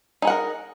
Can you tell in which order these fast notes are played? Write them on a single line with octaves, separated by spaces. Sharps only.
D#4 G#4 F#5 A#4